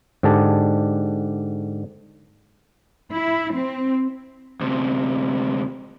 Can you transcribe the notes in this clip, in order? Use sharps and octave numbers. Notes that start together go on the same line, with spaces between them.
G#2 D3 G4 D5 G#5 A5
E4
C4
D2 C3